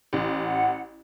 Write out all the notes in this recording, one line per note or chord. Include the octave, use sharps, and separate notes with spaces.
A1
F#5